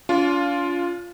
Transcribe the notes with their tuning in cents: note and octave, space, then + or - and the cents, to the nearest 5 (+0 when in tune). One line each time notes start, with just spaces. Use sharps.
D4 -45 F4 +0